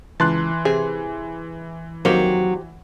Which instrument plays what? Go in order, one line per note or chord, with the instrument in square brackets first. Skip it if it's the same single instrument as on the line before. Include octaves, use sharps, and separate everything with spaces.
[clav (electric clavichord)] C#2 A5 [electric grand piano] E3 C6 F#6
[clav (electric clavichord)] C3 [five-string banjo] G#4
[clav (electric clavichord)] F2 D#3 A#3 [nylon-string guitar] F#3 [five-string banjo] G4 A#4 C5